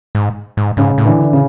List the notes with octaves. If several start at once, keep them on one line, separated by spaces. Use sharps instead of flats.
G#2
G#2
G#2 C#3
A2
D3 E3
D3
C#3